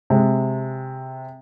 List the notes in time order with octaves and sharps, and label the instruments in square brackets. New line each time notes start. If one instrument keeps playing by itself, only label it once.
[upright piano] C3 G#3